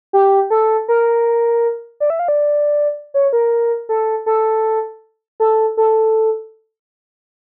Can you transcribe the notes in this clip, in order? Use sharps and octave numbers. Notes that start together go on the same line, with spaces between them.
G4
A4
A#4
D5
E5
F5
D5
C#5
A#4
A4
A4
A4
A4